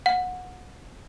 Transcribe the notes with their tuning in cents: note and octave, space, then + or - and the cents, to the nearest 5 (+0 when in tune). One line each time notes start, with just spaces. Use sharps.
F#5 -20